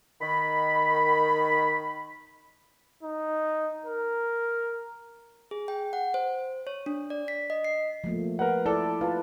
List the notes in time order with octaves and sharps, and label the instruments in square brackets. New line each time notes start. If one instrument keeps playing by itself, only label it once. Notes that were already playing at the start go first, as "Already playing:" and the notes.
[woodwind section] D#3 B5
[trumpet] D#4
A#4
[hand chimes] G#4
G5
F#5
C5
C#5
D4
D5
B6
D#5
C7
[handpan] F3 A3 A#3
[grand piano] A#4 B4 F#5
[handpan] E4 D5 [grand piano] A4
[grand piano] F4 A5 [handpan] B4